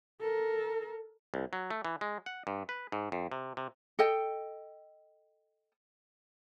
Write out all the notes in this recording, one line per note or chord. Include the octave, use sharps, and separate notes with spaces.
A4 A#4
C2
F#3
A3
E3
G#3
F#5
G2
B4
G#2
F2
C3
C3
A4 D#5 G5